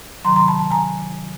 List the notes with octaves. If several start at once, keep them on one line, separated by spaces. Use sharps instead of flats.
C3 D#3 F#3 A#5 C6
A#5 C6
A5 B5
A5 B5
G#5 A#5